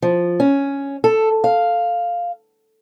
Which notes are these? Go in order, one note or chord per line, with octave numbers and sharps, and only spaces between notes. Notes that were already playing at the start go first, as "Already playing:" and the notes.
F3
C#4
A4
F5